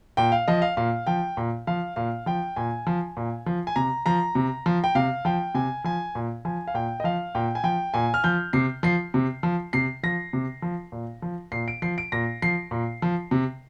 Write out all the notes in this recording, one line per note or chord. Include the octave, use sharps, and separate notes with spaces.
A#2 G5
F5
F3 D#5
F5
A#2 F5
F3 G5
A#2
F3 F5
A#2 F5
F3 G5
A#2 G#5
F3
A#2
F3
G#5
C3 A#5
F3 A#5
C3
F3
G5
C3 F5
F3 G5
C3 G#5
F3 G#5
A#2
F3 G#5
F5
A#2 G5
D#5
F3 F5
A#2 G5
G#5
F3 G5
A#2 G#5
F6
F3 G6
C3 C7
F3 C7
C3
F3
C3 C7
F3 A#6
C3
F3
A#2
F3
A#2 C7
D7
F3 C7
D7
A#2 A#6
F3 C7
A#2
F3
C3